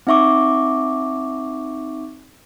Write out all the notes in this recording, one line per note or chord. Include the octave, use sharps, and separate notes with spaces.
C4 D#4 E5 C#6 D6